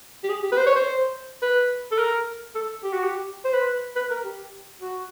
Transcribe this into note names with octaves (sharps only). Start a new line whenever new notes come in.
G4
G#4
G4
B4
C5
C#5
C5
B4
A4
A#4
A4
G4
F#4
G4
C5
B4
B4
A#4
G4
F#4